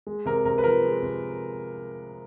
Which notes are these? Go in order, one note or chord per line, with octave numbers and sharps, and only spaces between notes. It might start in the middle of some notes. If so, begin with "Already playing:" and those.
G#3
C3 A#4
C3 A#4
B4
F3 A#4
G#3
C3